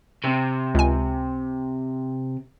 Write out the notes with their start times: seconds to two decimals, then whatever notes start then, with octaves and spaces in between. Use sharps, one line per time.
0.24 C3
0.75 C#2 G#5